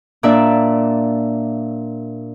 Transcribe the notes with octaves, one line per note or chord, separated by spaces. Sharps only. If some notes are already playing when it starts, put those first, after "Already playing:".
A#2 D4 D5 E5